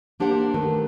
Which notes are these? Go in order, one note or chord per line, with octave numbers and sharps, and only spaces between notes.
A#3 D4 G4 C5 F#5
D#3 A3 B4